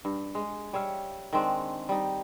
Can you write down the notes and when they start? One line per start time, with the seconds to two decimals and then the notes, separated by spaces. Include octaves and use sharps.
0.05 G2
0.35 G#3
0.73 G3 C#5 E5 F5
1.33 D#3 G#3 C4 D4
1.89 G3 D#4